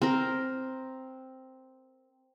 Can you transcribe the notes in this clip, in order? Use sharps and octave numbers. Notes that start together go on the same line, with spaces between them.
C4 A#4